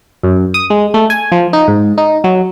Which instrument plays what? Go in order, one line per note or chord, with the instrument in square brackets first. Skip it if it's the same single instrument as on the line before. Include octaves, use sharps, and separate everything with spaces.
[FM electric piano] F#2
D#6
G#3
A3
G#5
F3
D#4
G#2
D#4
F#3